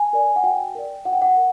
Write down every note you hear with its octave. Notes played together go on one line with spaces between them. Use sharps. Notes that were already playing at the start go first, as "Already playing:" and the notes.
Already playing: G#5
A#4 D5
F#5
F#4 G5
A#4 D5
F#4 F#5
G5
F#5
A#4